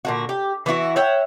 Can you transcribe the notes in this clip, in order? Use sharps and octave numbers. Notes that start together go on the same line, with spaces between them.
A#2 D3 F#4
G4
E3 B3 E4 F#4
C#5 E5 F#5 G5